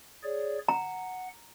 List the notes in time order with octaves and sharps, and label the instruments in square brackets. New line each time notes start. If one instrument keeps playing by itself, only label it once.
[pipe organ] G#4 C#5 D5
[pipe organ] F#5 [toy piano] A#5